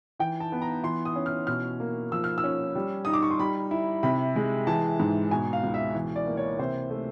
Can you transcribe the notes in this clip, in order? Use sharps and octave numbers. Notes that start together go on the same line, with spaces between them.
E3 G5
A5
B3
A#5
E3 C6
D#6
C#4
F6
B2 F6
A#3
F3 E6
F6
E6
C#4
G3
D#4 D#6
D6
C#6
C6
G3 B5
E4
C3 B5
G#3
E3 A5
G#2
B2 G#5
F5
C#2
E5
E3
D5
A#3
C#5
C3 C5
A3